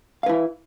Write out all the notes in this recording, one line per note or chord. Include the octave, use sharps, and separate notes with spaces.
E4 B4 F5